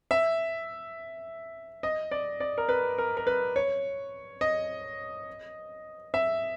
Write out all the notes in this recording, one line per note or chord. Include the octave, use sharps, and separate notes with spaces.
E5
D#5
D5
D5
A#4
B4
A#4
A#4
B4
C#5
D#5
E5